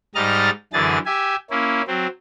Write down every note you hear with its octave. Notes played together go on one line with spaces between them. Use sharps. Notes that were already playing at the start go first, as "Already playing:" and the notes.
G#2 G3 D#5 A#5 F6 A6
F#2 D3 E3 G#4 A6
G4 E5 G#5
A#3 C#4 E4
F#3 C4